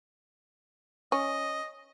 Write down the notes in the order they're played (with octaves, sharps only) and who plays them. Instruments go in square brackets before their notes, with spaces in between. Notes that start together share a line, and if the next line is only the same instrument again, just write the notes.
[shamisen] C#4 [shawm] D#5